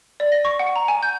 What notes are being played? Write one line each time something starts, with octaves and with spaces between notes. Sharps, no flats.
D5
A#6
C#6
F#5
A#5
G#5
G6